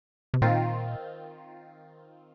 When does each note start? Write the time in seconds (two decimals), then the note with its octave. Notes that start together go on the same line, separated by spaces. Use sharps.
0.34 C3
0.42 A#2 D#3 C4 F4